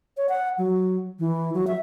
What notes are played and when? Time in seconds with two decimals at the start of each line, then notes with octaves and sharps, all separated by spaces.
0.17 C#5
0.29 F#5
0.58 F#3
1.19 E3
1.54 F#3
1.67 E5